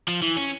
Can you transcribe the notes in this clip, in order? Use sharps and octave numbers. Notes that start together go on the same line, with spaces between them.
F3
E3
C#4